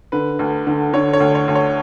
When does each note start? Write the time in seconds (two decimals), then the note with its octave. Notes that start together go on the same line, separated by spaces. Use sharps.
0.12 D3 B4
0.39 D2
0.67 D3
0.93 D3 C#5
1.13 C#5
1.20 D2
1.35 C#5
1.48 D2
1.55 C#5